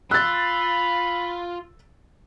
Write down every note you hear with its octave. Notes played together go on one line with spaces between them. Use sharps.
F4 B5 E6 F#6 A6